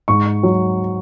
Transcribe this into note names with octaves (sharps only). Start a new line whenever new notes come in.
G#2 C#6
F#3